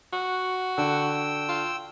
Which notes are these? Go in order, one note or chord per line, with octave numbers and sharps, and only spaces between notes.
F#4
D3 G5 E6
F4